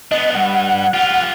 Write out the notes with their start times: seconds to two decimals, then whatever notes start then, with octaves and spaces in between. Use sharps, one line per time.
0.11 B3 D4 D#5
0.35 G2 F#5
0.93 F4 G4